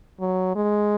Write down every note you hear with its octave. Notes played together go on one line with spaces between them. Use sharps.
F#3
G#3